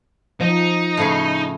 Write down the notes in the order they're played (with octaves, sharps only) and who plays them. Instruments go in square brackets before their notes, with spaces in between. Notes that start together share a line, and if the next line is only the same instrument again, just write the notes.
[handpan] F3 [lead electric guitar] D#4
[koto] A2 C#3 G#4